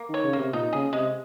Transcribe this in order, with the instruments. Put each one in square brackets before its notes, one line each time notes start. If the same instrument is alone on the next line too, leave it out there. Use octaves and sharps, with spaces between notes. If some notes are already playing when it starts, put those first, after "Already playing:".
Already playing: [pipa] A#3
[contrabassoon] D#3 [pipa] C#5
[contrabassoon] C#3
[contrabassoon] C3 [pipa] A#3
[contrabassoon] A#2 [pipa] D#4
[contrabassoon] C#3 [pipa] G#4
[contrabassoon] C3 [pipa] G#3